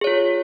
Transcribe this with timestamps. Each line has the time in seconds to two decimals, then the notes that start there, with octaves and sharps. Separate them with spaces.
0.01 G#4
0.04 C#5
0.07 F4